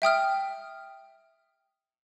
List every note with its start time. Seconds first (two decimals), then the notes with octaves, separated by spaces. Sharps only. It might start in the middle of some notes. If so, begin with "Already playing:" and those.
0.02 E5 G5 D#6 F6